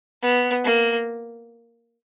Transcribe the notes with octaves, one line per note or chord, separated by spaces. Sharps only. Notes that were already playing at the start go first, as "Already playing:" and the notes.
B3
A#3